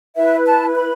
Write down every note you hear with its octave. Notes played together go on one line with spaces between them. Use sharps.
E4 B4 E5
A5
B5